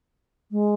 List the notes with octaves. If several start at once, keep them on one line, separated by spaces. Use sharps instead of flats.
G#3